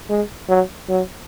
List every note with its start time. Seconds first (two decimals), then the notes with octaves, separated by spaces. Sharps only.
0.10 G#3
0.49 F#3
0.89 F#3